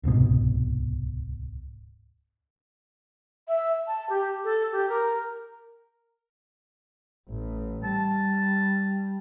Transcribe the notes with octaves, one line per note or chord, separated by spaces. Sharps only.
D1 C2 G#2 B2
E5
A5
G4
A4
G4
A#4
A1
G3 A5